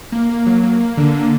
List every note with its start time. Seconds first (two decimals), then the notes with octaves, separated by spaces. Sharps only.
0.12 A#3
0.29 A#3
0.46 F#3
0.63 A#3
0.81 A#3
0.97 D3
1.14 A#3